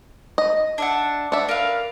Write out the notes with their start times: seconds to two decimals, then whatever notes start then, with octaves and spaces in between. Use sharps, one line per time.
0.38 D#5
0.78 D4 E5 F#5
1.32 D4 E5 F#5
1.49 A#4 B4 F5